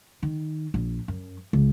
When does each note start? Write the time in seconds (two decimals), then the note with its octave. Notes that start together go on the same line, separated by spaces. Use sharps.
0.23 D#3
0.74 A#1
1.08 F#2
1.53 C#2